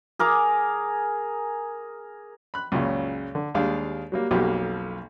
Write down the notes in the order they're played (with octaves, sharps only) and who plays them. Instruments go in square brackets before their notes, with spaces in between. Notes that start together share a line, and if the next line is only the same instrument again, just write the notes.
[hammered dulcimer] G#4 A#4 D6
[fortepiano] B5 F#6
C#2 F#2 A#2 C#3
D3
D#2 G3 G#3 D4 F5
F#3 G3 A#3
B1 F2 B2 F#3 A#3 G4